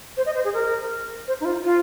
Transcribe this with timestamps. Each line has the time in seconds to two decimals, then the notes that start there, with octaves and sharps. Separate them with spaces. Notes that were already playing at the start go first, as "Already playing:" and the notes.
0.17 C5
0.26 D#5
0.35 C5
0.44 G#4
0.53 A#4
1.27 C5
1.41 D#4
1.45 F4
1.64 F4